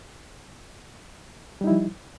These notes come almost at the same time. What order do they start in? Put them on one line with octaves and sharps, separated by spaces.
G3 D#4 E4 F3